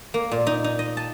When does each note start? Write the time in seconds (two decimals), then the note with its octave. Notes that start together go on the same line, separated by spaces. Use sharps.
0.14 A#3
0.31 A#2
0.47 D#4
0.64 D#4
0.79 D#5
0.97 A5